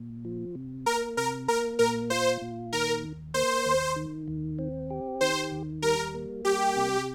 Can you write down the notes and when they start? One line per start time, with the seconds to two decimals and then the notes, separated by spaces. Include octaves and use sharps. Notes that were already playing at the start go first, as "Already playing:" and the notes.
Already playing: A#2
0.25 F3
0.55 C3
0.86 A#3 A#4
1.17 C3 A#4
1.48 A#3 A#4
1.79 A#2 A#4
2.10 F4 C5
2.41 A#2
2.73 D#3 A#4
3.03 D#2
3.34 A#3 C5
3.66 D#2
3.96 D#3
4.28 D#2
4.59 C4
4.90 G4
5.21 D#3 C5
5.52 D#2
5.82 G3 A#4
6.14 A#3
6.45 G3 G4
6.76 C3